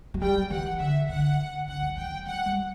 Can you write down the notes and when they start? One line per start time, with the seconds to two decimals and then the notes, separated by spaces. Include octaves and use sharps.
0.14 F#3
0.22 G3 G5
0.50 E3 F#5
0.79 D3 E5
1.09 D3 F#5
1.68 D3 F#5
1.83 E3
1.97 E3 G5
2.12 F#3
2.26 F#3 F#5
2.46 G3